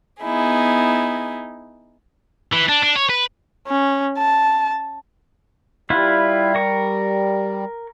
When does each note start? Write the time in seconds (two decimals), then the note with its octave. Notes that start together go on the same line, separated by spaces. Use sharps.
0.22 B3 D#4 E4 G#4
2.52 E3
2.68 D4
2.83 D4
2.96 C#5
3.10 B4
3.67 C#4
4.18 A5
5.90 G3 E4 F4 B4
6.55 A#4 C#6